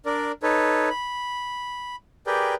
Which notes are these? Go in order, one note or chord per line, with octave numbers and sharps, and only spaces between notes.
D4 A#4 D5
D#4 A4 B4 C#5
B5
G4 G#4 A#4 B4 D5 G5